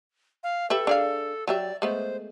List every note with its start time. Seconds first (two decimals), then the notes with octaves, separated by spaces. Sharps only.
0.43 F5
0.70 G4 A4 B4 E5
0.87 D4 G#4 F5
1.48 F#3 G4 D5 E5
1.82 G#3 A3 B3 C5